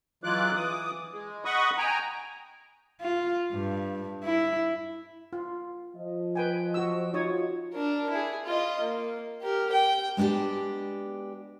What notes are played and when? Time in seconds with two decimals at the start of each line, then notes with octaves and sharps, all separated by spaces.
0.24 E3 F#3 G#3 F4 D6 F#6
0.55 E3 D6 D#6
1.11 G#3
1.45 D#5 F#5 B5 C#6 D#6
1.78 G5 G#5 A#5
3.01 F4
3.52 G2
4.24 E4
5.33 F4
5.96 F3 D#5
6.35 B4 G5 G#5
6.74 F#4 E6
7.14 D#4 F4 F#4 C#5 D#6
7.73 D4 A#4
8.09 E4 G#4
8.45 F4 D#5
8.80 A#3
9.42 G4 A#4
9.72 G5
10.17 G#3 B3 D4 F#4 G4